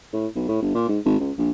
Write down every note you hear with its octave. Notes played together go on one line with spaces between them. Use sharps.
A2
B1
A2
G1
A#2
G#2
G#1
C#2
A#1